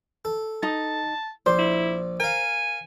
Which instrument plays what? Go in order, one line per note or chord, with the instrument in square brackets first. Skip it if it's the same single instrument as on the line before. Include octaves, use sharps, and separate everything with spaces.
[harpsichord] A4
[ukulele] D#4 [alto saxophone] A5
[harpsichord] A#1 D5 [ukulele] C5
[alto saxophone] E4
[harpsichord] A#4 F5 [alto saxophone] G#5